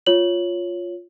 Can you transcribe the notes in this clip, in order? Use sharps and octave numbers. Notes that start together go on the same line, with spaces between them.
F4 C#5 F#7